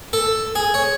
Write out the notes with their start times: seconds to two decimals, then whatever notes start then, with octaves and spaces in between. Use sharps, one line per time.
0.13 A4
0.55 G#4
0.74 C#5